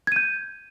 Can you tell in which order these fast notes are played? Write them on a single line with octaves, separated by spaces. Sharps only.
G#6 D#7 G6